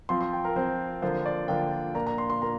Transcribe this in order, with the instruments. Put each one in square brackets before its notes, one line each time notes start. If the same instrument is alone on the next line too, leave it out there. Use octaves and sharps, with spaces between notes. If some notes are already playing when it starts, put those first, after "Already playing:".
[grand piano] F3 C4 F4 C6
C6
G5
A#4
F3 C4 F4 C5
D3 F3 A#3 F4 C5
D5
D3 F3 A#3 F4 G5
A#2 A#3 D4 F4 A#5
A#5
C6
C6
A#2 A#3 A#5